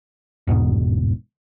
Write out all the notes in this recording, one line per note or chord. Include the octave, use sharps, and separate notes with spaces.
G1 E2 G#2 B2